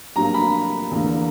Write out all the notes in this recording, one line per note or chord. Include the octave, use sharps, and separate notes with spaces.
G2 F#3 A#3 A#5
B5
E2 D3 A#3